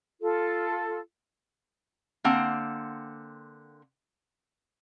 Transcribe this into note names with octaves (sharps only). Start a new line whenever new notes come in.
F4 A4
D3 A#3 C4 F#5